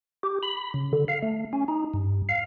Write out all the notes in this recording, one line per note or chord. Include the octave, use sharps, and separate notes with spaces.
G4
B5
C#3
D3
F5
A3
C#4
D#4
G2
F5